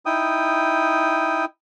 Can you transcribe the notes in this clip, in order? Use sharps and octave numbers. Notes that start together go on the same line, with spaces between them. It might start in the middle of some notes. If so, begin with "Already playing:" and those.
D#4 E4 G5 D#6